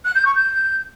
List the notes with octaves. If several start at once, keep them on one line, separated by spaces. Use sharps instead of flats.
F#6
G6
C#6
G6